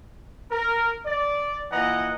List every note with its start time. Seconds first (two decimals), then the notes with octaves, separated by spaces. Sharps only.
0.51 A#4
1.05 D5
1.71 A#2 E3 D#5 F#5 A#5